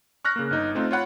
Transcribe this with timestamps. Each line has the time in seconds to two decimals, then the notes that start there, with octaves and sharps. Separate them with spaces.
0.25 C#6 F6 F#6 A#6
0.36 C#3 A#3
0.51 G1 D#4
0.75 A3 C4 D#4 F4
0.91 F4 C#5 F#5 B5